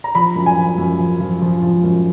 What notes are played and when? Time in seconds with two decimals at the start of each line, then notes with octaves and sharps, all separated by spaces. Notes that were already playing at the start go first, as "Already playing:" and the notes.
0.04 A#5
0.15 F3 B5
0.36 F#2
0.46 G#5
0.57 F3
0.78 F#2
1.00 F3
1.21 F3
1.42 F3
1.63 F3
1.84 F#2